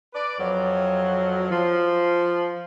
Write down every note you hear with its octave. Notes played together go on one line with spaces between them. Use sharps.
B4 D5
F2 F#3
F3